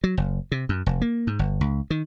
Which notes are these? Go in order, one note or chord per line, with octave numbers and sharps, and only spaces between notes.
F#3
F#1
C3
F#2
F1
A#3
G#2
G1
C#2
D#3